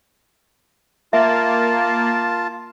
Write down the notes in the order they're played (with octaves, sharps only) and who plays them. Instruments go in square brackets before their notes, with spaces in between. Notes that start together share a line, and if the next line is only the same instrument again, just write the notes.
[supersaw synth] A#3 [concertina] F4 A5 [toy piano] E5